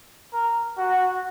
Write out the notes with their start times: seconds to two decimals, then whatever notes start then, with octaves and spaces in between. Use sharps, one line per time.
0.33 A#4
0.77 F#4